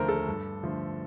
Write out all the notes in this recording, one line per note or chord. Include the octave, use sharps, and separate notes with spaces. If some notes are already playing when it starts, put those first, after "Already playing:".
Already playing: D#2 D3 F3 A3 A#4 C5
A4
G2
D3 F3 A3